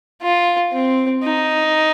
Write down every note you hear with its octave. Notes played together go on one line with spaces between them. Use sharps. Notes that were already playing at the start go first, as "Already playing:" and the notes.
F4
C4
D#4